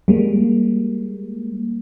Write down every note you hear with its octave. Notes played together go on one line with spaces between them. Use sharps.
G3 G#3 A#3